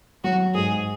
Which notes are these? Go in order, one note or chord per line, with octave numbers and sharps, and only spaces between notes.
F#3 F#4
G#2 G#4